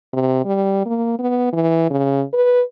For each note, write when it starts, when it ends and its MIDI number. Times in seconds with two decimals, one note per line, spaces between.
0.14 0.44 48
0.45 0.85 55
0.86 1.19 58
1.19 1.50 59
1.53 1.87 52
1.91 2.23 49
2.33 2.62 71